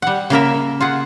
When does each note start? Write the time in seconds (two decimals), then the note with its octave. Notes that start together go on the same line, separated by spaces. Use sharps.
0.02 G3 F#5
0.30 C#3 A#3 A#4 E5
0.81 F4 G#4 F#5